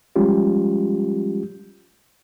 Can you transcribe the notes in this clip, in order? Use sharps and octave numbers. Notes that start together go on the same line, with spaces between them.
F3 G3 G#3 C#4 F4 G4